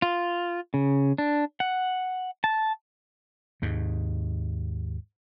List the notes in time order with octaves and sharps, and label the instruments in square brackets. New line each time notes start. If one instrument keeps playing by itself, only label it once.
[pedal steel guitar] F4
C#3
D4
F#5
A5
[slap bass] D#2 G#2